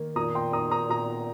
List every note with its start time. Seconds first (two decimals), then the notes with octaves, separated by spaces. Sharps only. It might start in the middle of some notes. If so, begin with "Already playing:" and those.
Already playing: D#3 A#3
0.16 A#2 A#5 D#6
0.35 G5 C6
0.53 A#3 A#5 D#6
0.71 A#5 D#6
0.90 A#2 A#5 D#6